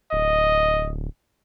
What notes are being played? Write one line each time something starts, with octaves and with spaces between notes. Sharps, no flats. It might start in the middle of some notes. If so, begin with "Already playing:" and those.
D1 D#5